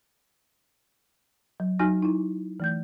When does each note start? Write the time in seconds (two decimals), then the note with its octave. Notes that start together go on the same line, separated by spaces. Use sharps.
1.60 F#3
1.79 F#3 D#4 F#4 G#5 F6 A#6
2.03 D#4 E4
2.60 E3 A3 G6